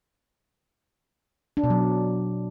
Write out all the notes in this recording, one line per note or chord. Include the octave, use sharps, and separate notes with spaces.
D4
B2
F#3